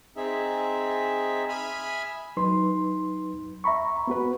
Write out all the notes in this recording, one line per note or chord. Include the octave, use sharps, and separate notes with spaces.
C4 D#4 G#4 E5
E5 G#5 B5 D#6 F6
F#3 D#4 B4 C6
E5 A#5 B5 C#6
B3 F#4 B4